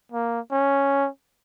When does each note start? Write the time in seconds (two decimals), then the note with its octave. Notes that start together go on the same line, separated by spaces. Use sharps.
0.12 A#3
0.52 C#4